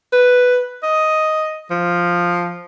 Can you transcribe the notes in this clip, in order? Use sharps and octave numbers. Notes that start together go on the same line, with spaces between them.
B4
D#5
F3